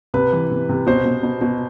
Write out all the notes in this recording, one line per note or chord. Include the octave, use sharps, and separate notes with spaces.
C3 B4
E3
C3
C3
B2 C5
B2
B2
B2